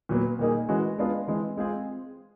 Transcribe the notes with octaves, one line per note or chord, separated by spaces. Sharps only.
A#2 F#3 B3
A#2 G3 A#3 D#4 G#4
E3 G#3 C#4 F#4
G#3 B3 D4 F4 G#4
E3 G#3 C4
G#3 C4 F4 G#4